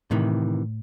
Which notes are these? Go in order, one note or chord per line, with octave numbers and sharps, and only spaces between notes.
A2 C3 D#3 E3